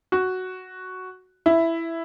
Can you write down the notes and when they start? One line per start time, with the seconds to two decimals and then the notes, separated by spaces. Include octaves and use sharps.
0.12 F#4
1.46 E4